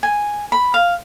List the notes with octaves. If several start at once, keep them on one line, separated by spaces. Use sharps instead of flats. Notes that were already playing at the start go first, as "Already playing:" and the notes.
G#5
B5
F5